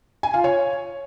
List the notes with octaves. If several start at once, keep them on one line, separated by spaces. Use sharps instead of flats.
G#5
F4
C#5